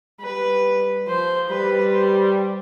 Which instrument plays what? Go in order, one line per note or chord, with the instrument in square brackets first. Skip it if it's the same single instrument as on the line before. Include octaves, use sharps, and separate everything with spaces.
[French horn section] G3 [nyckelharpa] B4
[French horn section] F3 [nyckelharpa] C5
[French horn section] G3 [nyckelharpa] B4
[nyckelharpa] C5